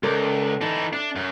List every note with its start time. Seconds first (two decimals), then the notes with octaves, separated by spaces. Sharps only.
0.03 C#2 A4 A#4 D5
0.61 E3 D#4 A5
0.93 D4 E5
1.16 F#2